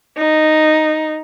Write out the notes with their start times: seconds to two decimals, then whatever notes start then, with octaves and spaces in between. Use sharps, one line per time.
0.18 D#4